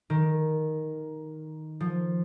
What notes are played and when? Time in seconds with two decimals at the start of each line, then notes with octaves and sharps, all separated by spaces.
0.10 D#3
1.80 F3